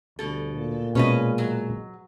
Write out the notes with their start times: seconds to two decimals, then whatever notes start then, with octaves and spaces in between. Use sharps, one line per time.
0.19 D2 B2 G3 A4
0.54 A#2
0.95 B2 G#3 C#4 B4 D#5
1.38 F#3